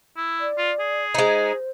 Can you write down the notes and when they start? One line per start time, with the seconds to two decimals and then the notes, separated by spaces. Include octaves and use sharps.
0.17 E4
0.40 D5
0.58 F4
0.80 G#4
1.15 G#3 D#4 C5